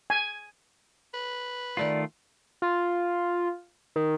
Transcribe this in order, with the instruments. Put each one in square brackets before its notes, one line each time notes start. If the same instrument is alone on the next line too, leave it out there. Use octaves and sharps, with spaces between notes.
[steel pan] G#5
[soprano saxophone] B4
[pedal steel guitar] D#3 A3 F4 [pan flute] D5
[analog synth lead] F4
D#3